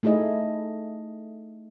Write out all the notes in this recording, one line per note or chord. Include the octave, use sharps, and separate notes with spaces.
A3 D#4 E4 G#4 D#5